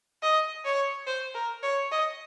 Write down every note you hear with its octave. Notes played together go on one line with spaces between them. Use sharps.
D#5
C#5
C5
A#4
C#5
D#5